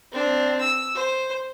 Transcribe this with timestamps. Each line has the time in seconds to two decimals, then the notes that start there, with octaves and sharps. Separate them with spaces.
0.12 C4 D4
0.60 E6
0.95 C5